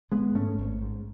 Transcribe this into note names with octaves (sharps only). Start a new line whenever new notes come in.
G#1 G#3 B3
G#2 A3 C#4
G#1
G#2